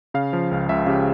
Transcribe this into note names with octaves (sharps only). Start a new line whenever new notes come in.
C#3 F5
F3
C#2
C#2 E5
C#3 G4